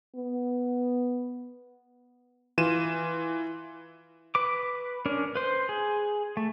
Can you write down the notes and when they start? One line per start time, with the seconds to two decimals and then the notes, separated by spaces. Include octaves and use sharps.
0.16 B3
2.58 E3 F4 D#7 E7
4.35 B4 D6
5.06 C#4 D4 A#4
5.35 B4 C5
5.69 G#4
6.37 A3